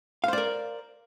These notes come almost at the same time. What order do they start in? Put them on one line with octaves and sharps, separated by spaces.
F5 C5 D5 A#4